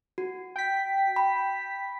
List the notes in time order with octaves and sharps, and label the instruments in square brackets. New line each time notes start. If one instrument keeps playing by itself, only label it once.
[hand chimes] F#4
[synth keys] G5 B6
[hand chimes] B5